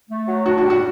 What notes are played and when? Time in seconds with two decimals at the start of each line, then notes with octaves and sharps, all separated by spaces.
0.10 A3
0.28 F#3
0.46 D4 F#4
0.58 F#4
0.64 G3
0.70 F#4